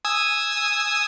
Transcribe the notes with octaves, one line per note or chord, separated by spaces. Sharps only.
G#5 D#6 E6